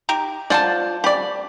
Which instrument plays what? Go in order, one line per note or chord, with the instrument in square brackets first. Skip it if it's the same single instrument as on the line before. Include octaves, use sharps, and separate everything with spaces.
[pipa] D#4 G4 A#4
[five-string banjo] F4 C5 [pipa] D5 F#5 A5
[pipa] G4 [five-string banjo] D5 B5